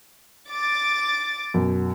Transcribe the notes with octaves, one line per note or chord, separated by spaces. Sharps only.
D6 A6
F#2 B2